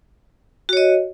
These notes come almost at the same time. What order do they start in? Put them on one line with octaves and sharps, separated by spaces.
F#4 C#5 D#5